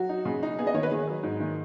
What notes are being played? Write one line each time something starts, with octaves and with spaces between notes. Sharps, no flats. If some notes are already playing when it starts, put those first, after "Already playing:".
Already playing: F#3 F#4
D#4
C#3
D#4
B3 G#4
D#5
D#3 C#5
B4
D#3 G#4
F#3
G#2
D#3